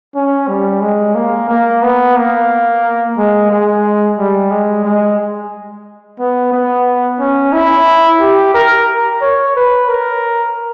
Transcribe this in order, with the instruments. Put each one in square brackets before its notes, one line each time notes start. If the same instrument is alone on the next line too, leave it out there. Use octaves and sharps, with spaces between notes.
[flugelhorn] C#4
G3
G#3
A#3
A#3
B3
A#3
G#3
G#3
G3
G#3
G#3
B3
B3
C#4
E4
G4
A#4
C#5
B4
A#4